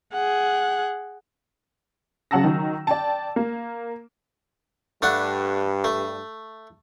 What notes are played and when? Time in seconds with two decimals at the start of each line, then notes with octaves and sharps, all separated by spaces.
0.13 G#4 F#5
2.31 C#3 F#3 F#5 A5 E6 A#6
2.44 D#3 F#3
2.87 D5 G5 A5
3.36 A#3
5.02 G2 A3 D4 F#5
5.84 A3